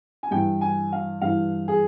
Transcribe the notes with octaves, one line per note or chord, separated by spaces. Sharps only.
G#5
G2 E3 G5
G#5
F5
G2 E3 F5
G#4